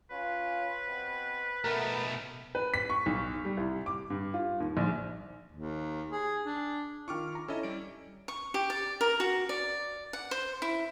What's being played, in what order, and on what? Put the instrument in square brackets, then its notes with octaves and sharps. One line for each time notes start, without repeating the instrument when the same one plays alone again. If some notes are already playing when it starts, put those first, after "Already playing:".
[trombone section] C#4 F4 [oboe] B4
[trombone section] B2 C4
[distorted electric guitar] B1 A3 [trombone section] B2 B3 [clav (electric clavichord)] A#4
[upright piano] B4
B6
C#6
B1
G3
C2
D6
G2
F4
D#2
A#1
[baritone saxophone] D#2
G#4
D4
[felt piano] D#3 F4 [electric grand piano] C#6 D6 F6
[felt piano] A#5
[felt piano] C#4 E4 [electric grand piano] A4 D#5 G#5
[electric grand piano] G3 D5 D7
[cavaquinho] C#6
G4
D5
A#4
F#4
D5
F#5
C5
E4